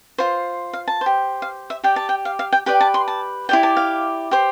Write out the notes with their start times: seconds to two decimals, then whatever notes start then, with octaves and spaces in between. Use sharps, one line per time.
0.18 F4 C5
0.73 F5
0.88 A5
1.01 G4 C5
1.42 F5
1.70 E5
1.84 G4 D5 G5
1.96 A5
2.09 G5
2.25 F5
2.39 F5
2.53 G5
2.66 G4 B4 D5 G5
2.81 A5
2.94 C6
3.08 A5
3.49 E4 G4 D5 G5
3.63 A5
3.77 F5
4.31 G4 C5